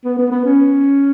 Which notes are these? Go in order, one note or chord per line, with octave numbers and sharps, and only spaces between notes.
B3
B3
B3
C#4